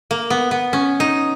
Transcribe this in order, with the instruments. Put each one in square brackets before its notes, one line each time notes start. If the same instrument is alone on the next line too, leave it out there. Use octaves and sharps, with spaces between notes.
[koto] A#3
B3
B3
C#4
D#4